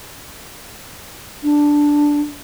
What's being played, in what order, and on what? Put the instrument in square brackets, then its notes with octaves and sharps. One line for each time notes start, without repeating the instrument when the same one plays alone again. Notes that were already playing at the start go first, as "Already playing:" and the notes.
[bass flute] D4